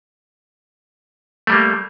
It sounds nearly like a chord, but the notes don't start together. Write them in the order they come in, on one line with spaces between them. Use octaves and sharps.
A3 G3 A#3